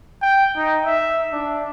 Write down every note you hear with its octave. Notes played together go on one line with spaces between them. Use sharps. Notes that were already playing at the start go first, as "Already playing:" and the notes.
G5
D#4
E5
D4